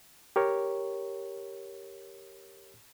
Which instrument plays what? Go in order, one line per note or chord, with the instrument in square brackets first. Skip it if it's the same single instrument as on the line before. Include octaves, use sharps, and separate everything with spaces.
[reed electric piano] G4 A#4 C#5